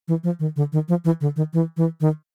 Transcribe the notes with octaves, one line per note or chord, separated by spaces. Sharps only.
E3
F3
D#3
D3
D#3
F3
E3
D3
D#3
E3
E3
D#3